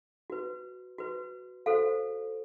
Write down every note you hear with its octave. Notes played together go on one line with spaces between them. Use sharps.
F#4 B4
F#4 B4
F#4 A4 C5 F5